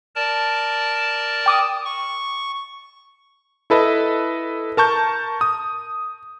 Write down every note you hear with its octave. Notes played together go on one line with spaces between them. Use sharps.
A#4 D5 A5
G5 D6 D#6
C#6
E4 A4 B4 D#5
A#4 A5 C#6 G6
D#6